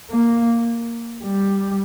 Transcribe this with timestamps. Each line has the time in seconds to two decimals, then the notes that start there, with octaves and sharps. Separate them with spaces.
0.11 A#3
1.24 G3